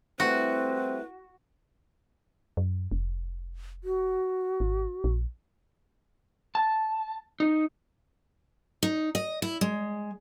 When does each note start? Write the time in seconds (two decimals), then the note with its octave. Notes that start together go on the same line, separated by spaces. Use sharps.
0.20 G3 A3 C4 E4 F#4 B4
2.57 F#2
2.92 F1
3.84 F#4
4.60 G#1
5.04 A#1
6.55 A5
7.40 D#4
8.83 D#4
9.15 D#5
9.42 E4
9.61 G#3